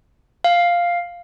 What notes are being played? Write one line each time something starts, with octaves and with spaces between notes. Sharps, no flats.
F5